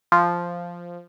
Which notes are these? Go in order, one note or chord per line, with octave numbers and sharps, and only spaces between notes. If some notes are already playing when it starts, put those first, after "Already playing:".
F3